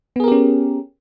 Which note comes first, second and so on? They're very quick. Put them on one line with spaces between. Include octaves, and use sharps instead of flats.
B3 G#4 A#4 G4 C#4